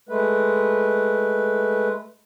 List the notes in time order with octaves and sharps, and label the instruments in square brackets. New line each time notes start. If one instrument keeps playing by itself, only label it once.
[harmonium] G#3 A3 B4